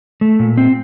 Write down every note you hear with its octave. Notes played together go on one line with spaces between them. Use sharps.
A3
A#2
C4